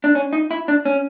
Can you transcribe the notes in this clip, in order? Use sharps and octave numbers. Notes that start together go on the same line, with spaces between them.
D4
C#4
D#4
E4
D4
C#4